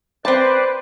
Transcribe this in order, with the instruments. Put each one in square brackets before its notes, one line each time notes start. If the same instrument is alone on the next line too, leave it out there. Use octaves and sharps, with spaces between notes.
[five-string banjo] C4 A5 [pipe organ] B4 C5 D5